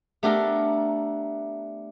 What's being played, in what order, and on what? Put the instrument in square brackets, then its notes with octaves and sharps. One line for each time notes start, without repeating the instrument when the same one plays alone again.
[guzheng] A3 B3 D4 G4 A4 A#4